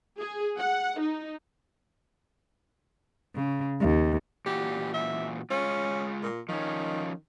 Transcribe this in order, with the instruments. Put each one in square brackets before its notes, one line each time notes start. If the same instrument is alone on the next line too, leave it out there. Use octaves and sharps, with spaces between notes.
[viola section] G#4
F#5
D#4
[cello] C#3
D#2
[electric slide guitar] A#2 E3 F#4 [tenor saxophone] G4
[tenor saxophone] E5
[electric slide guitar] G#3 F4 [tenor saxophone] C#4
[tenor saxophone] A#2
[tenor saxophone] D#3 [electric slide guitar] F3 C#4